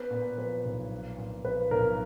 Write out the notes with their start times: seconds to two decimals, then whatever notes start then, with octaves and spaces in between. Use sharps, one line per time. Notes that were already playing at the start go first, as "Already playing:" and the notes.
Already playing: B3 B4
0.11 A#2
0.37 F3 B4
0.65 B1
0.92 B3
1.18 A#2
1.45 F3 B4
1.71 B1 A#4